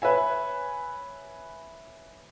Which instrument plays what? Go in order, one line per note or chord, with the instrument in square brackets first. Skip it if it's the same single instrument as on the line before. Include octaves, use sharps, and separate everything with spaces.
[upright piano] B4 C#5 E5 G#5